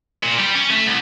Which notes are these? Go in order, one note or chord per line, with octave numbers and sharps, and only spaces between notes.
A#2
G3
C#4
A3
C2